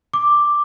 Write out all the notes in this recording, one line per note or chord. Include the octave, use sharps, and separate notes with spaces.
D6